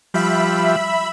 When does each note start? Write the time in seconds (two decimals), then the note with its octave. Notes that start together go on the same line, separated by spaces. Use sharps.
0.14 F3 G3 E5 B5